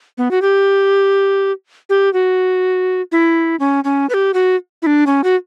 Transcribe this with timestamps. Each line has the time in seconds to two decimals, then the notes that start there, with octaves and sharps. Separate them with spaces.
0.18 B3
0.31 F#4
0.42 G4
1.90 G4
2.13 F#4
3.12 E4
3.60 C#4
3.84 C#4
4.10 B4
4.14 G4
4.34 F#4
4.82 E4
4.87 D4
5.07 C#4
5.24 F#4